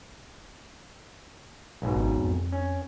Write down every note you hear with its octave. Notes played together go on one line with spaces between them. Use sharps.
B1 G#2 B2
G#1
F2
C#4